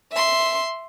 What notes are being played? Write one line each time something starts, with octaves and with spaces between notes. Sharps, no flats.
E5 C6